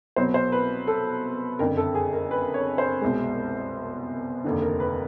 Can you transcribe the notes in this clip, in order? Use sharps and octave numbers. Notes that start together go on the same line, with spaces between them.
C2 B2 F#3 B3 C5
C5
B4
A4
F#1 F2 D3 A#4
A4
G#4
A#4
B4
C#5
C5
C2 B2 G#3
F1 D#2 D3
A#4
B4